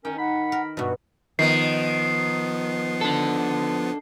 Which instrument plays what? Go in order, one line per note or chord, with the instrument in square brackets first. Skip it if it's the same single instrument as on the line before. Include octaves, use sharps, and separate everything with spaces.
[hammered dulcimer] D#3 [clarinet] C#4 [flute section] A#4 [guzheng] G5
[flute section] F#5 [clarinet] B5
[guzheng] A#4
[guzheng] G2 B2 [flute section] F#4
[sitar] D#3 [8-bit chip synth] F3 B3 [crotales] C7
[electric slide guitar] D4 A4